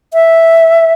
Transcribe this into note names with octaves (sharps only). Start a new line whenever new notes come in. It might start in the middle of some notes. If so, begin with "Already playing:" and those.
E5